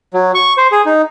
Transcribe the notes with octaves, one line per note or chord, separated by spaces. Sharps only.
F#3
C#6
C5
G#4
D#4